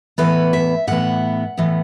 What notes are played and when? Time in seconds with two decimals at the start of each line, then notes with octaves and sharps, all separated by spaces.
0.18 A2 E3 B3 B4
0.53 E5
0.87 A2 E3 B3 F#5
1.57 A2 E3 B3